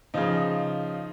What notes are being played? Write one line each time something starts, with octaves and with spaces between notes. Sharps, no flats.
C#3 F3 D#4